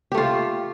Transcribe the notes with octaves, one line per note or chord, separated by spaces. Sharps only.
A3 F4 G4